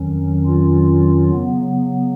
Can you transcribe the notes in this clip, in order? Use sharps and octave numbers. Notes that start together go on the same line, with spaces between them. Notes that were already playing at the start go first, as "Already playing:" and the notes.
Already playing: F2 D#3 F#3 C#4
F4
C#3 F#3 B3